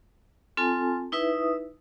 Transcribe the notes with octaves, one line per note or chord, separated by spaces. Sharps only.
C4 F4 A4 G#5 A5
D#4 E4 B4 E5 D#6